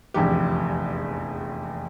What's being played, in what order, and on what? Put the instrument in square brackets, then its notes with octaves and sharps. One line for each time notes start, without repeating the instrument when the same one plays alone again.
[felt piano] F1 A#1 E2 G4